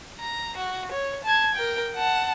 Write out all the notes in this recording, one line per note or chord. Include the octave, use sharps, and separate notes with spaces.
A#5
F#4
C#5
A5 G#6
A#4 G5
F#5 A5